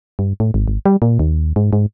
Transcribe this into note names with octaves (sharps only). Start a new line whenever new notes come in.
G2
A2
G#1
G#1
G3
A#2
D#2
G#2
G#2